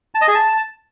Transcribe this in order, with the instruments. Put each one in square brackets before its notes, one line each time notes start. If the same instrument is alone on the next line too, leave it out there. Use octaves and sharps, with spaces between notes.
[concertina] A5
D#5
G#4
A5